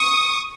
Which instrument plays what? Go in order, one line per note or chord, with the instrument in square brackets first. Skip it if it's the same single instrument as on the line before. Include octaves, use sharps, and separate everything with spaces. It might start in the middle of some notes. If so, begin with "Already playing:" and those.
Already playing: [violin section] C#6 D#6